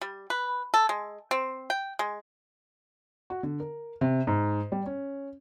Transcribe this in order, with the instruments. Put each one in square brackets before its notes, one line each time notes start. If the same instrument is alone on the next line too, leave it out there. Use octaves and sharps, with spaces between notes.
[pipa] G3
B4
A4
G#3
C4
G5
G#3
[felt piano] F#4
D3
A#4
C3
G#2
G3
C#4